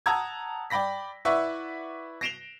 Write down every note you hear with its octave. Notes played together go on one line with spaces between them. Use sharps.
F#5 A5 A#5 D#6 E6 G#6
D5 G5 B5 A#6 B6
E4 B4 D5 E5 F#5 C#6
A#6 C7 D7 E7 F7 G7